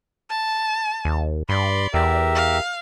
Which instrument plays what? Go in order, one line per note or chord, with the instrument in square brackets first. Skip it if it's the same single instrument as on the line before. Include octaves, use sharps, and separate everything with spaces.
[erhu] A5
[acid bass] D#2
[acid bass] G2 [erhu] D5 [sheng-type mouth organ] B5 C6
[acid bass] E2 [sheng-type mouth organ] G4 A#4 E5
[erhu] F5